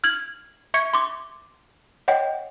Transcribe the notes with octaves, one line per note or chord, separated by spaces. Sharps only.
F6 G#6 F#7
E5 C#6 G#6 C#7
C6 D6
C#5 D#5 F#5 G5